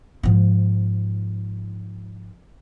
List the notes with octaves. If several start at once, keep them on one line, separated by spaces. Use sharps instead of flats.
G#2 F3